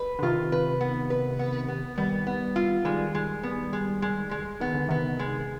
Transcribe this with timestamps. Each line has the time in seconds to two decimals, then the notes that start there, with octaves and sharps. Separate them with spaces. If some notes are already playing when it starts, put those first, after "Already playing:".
Already playing: B4
0.19 D3
0.23 C3 D#3 F4
0.52 B4
0.81 B3
1.10 B4
1.39 B3
1.68 B3
1.98 D#3 G3 B3
2.27 B3
2.56 F4
2.85 D#3 G3 G#3
3.15 G#3
3.43 B3
3.73 G#3
4.02 G#3
4.31 G#3
4.60 D#3 B3
4.74 D3
4.88 C3 D#3 B3
5.19 G#3